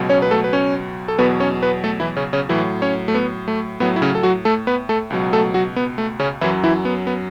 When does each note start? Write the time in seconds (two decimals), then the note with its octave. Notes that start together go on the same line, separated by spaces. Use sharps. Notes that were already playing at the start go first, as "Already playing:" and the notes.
Already playing: C#2 B2 F#3
0.09 C#4 C#5
0.22 B4
0.31 A3 A4
0.44 B4
0.53 C#4 C#5
1.08 A4
1.18 E2 B2 F#3 B3 B4
1.40 C#4 C#5
1.63 B3 B4
1.84 A3 A4
2.00 E3 E4
2.17 C#3 C#4
2.33 C#3 C#4
2.49 A2 E3 F#3 E4
2.82 C#4 C#5
3.08 A3
3.14 B3
3.48 A3
3.80 A2 F#3 B3
3.96 E4
4.02 C#3 C#4
4.15 A4
4.23 F#3 F#4
4.45 A3 A4
4.67 B3 B4
4.89 A3 A4
5.10 C#2 B2 F#3
5.33 A3 A4
5.54 F#3 F#4
5.76 B3
5.98 A3
6.19 C#3 C#4
6.41 F#2 E3 F#3 E4
6.64 E3 E4
6.85 B3
7.07 B3